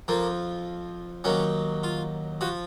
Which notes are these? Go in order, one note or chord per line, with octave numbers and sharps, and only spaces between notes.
F2 F3 A#3
D#2 D#3 F#3 C#4
F4
F3 F#4